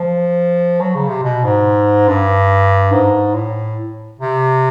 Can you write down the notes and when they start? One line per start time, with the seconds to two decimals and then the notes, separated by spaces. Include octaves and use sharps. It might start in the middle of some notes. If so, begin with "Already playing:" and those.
Already playing: F3
0.80 F#3
0.95 C#3
1.08 C3
1.23 B2
1.44 G#2
2.08 G2
2.92 G#2
3.34 A2
4.20 C3